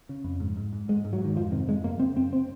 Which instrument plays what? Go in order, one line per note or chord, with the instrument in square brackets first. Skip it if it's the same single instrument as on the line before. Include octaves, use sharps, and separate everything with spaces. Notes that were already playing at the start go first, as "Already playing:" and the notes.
[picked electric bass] C#3
F2
G#2
G#2
G#2
G#2 G#3
G#2
F#3
G#2 D#3
F2 F3
C3 D#3
F2 G#3
F#2 A#3
C#3 C4
F#2 C4
C4